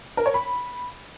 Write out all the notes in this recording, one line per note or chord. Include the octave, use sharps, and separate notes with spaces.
A#4
C#5
B5